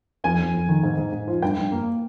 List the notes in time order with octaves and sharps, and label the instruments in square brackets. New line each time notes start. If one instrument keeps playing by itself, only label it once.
[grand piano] F2 [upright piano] G#5
[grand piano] F2
F2
D#3
G#2
G#2
G#2
F3
[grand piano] G2 [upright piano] G5
[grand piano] G2
A#3